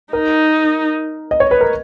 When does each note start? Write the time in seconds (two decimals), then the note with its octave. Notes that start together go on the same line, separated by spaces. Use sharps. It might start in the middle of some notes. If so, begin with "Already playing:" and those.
0.13 D#4 A#4
1.31 D#5
1.40 C#5
1.51 B4
1.61 A#4